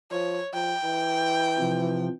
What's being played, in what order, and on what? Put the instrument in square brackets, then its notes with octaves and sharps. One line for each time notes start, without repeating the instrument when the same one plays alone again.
[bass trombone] F3 [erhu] C#5
[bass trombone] F3 [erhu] G5
[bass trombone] E3
[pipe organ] C3 F3